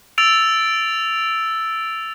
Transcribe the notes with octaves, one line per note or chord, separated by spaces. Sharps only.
E6 A6 D7 F7